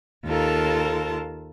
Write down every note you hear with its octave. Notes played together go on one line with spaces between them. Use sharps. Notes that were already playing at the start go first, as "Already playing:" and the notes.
D#2 F4 A4 A#4 A5